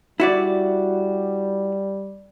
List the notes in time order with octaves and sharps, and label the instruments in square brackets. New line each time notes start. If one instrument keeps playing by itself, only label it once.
[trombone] G3 [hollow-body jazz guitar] E4 F#4 D5